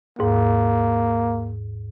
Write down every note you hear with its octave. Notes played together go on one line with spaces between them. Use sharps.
D#2 G#2 A#3